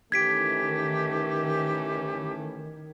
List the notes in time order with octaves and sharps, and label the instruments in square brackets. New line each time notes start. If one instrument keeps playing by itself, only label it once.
[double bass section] D#3 [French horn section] E3 A3 C#4 [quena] G4 [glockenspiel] G#6 B6 D7